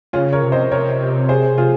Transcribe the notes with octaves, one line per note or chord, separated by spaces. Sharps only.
C#3 C#4 F4
A#4 C#5
C3
C5 D#5
C3 A#4 C#5
G#4 C5
F4 G#4